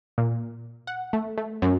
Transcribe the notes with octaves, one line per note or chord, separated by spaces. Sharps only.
A#2
F#5
A3
A3
F#2